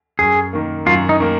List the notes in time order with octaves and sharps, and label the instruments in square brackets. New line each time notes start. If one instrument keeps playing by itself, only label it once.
[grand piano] F#2 [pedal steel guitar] G#4
[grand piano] D#3 A#3
[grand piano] F#2 [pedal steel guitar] F4
[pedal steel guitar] D#4
[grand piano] D#3 A#3